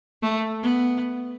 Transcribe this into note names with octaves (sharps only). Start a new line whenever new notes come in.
A3
B3